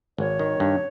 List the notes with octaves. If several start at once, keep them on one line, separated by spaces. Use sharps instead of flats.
G#1 C#5
D#3
G2